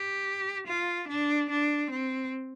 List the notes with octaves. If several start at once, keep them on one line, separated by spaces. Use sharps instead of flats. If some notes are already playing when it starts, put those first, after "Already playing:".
Already playing: G4
F4
D4
D4
C4